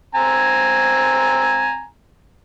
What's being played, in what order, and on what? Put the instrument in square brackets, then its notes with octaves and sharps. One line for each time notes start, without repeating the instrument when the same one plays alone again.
[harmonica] C4 G#5 A#5